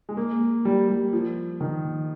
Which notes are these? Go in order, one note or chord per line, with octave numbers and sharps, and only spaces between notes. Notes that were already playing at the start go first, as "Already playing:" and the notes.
G#3
A#3
G3
G3
F3
D#3